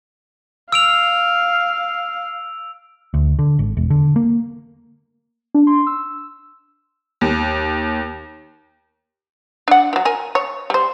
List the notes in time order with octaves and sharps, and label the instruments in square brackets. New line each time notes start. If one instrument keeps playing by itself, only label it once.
[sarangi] F5 [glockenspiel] E6 D7 F7
[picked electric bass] D2
D3
G#1
E1
D3
A#3
[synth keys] D4
C6
E6
[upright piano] D#2
[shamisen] D4 F#5
E3 F#3
A#4 G#5
C#5
G3 C5